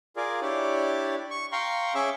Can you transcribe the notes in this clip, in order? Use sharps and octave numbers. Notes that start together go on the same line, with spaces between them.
F4 G#4 A#4 D5
D4 E4 G4 C#5 D5
C#6
F5 G5 A#5 C6 C#6
C#4 G#4 E5 C#6 D6 E6